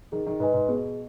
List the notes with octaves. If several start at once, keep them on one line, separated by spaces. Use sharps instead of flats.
D#3 G#4
D#3
G#2 B4 D#5 G#5
G#2
B2 G#4